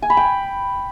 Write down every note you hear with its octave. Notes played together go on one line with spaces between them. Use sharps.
G#5
B5
G5